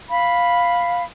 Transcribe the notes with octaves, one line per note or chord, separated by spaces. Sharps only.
F5 B5